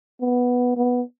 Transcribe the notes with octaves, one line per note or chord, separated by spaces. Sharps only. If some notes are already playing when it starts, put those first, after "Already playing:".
B3
B3